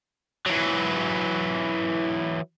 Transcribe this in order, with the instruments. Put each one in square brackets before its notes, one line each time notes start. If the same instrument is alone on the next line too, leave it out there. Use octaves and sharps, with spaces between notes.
[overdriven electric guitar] E3 F#3